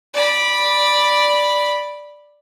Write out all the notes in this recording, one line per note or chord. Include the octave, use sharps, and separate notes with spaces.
D5 B5